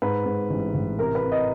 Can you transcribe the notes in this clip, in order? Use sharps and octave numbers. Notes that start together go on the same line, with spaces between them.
G#2 B4
G#2
A1
A1
C3 A#4
B4
C3
D#5